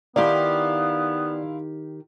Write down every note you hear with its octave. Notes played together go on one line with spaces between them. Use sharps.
D#3 B3 E4 G4 D5 F5 C6